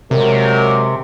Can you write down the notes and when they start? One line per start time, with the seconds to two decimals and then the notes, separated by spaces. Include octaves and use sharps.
0.11 C3 F#3 G#3 A#4